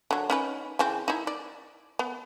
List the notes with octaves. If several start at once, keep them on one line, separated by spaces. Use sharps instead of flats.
D3 F#3
C#4 D#4 B4
C#3 E3 C4
D#4 E4
D5
B3